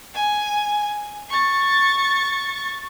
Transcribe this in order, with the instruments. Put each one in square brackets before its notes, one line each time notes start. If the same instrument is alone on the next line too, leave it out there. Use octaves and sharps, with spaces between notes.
[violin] G#5
C#6 A6